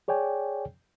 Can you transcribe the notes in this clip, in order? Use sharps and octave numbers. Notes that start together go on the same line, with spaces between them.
G#4 C#5 D5 G5 G#5